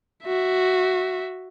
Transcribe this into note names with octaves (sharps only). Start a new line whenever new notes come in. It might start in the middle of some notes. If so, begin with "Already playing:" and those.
F#4 E5